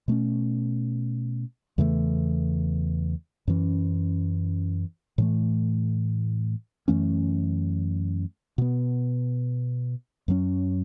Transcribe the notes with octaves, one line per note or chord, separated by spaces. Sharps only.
B2 A3 C#4
E2 C#3 E3 A3
F#2 E3 C#4
A2 E3 A3
F#2 E3 A3 C#4
B2 B3
F#2 F#3 C#4